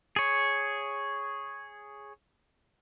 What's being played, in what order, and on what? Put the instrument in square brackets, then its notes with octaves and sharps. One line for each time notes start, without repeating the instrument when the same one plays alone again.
[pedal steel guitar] G#4 C#5